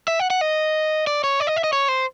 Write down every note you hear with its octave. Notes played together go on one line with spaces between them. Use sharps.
E5
F#5
F#5
D#5
D5
C#5
D5
D#5
E5
D#5
C#5
C5